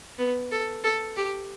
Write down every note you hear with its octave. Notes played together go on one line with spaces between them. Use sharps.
B3
A4
A4
G4